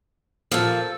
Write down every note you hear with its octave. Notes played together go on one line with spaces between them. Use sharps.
A#2 F3 A4